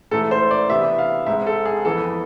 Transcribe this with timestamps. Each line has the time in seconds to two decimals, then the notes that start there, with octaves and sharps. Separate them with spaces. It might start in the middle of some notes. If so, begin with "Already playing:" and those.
0.11 G#2 E3 A3 A4
0.31 C5
0.51 D5
0.69 C3 E3 B3 D4 E5
0.98 F5
1.26 G#2 G#3 C4 E5
1.46 A4
1.65 G#4
1.85 F2 E3 B3 A4